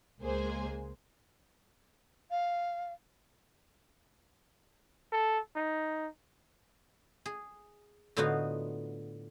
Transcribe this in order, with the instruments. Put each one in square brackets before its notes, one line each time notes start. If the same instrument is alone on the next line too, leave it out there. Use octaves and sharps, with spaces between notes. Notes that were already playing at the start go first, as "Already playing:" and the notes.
[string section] C#2 G#3 A#3 G#4 C5 G#5
[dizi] F5
[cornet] A4
D#4
[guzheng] G#4
A2 D3 B3 D#4 F4 F#4